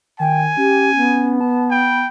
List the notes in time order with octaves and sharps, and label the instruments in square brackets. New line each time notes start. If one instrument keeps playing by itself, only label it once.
[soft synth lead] D#3 [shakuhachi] G5 [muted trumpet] G#5
[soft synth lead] C#4 [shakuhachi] G4
[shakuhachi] B3
[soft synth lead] A5
[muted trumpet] G5 [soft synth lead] B5